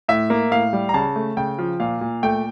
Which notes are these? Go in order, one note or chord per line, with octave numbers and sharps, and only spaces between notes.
A2 E5
A#3
A2 F5
G3
A#5
C#3 A5
A3
C#3 G5
F3
A#2 F5
A#2
A3 G5